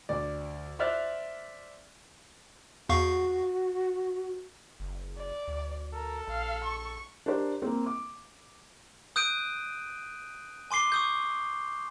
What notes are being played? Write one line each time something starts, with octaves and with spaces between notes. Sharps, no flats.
D2 D5
C5 D5 E5 F6 F#6 A6
E2 F#4 F5 C#6
F#1
D5
D2
A4 A#4
A#1 F5
C#6
D4 G4 A#4 C5
A#3 C4
D6
D#6 F#6 G6 D7 D#7
G#5 C6 D6 C7 G7
C#6 D#6 G6